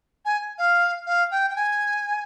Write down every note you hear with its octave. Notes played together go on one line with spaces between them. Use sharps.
G#5
F5
F5
G5
G5
G#5